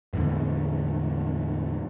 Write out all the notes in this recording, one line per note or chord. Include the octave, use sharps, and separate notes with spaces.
E2 A2 D3 G#3